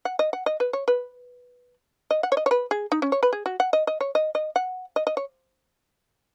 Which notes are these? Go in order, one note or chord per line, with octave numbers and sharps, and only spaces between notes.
F#5
D#5
F#5
D#5
B4
C#5
B4
D#5
F#5
C#5
D#5
C#5
B4
G#4
D#4
C#4
C#5
B4
G#4
F#4
F#5
D#5
D#5
C#5
D#5
D#5
F#5
D#5
D#5
C#5